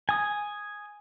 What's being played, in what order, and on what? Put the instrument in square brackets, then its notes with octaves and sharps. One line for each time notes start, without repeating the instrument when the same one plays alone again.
[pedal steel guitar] G#5 D#6